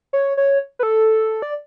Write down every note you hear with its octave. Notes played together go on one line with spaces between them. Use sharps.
C#5
C#5
B4
A4
D5